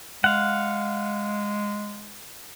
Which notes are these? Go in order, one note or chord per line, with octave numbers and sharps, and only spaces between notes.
G#3 F5 F#5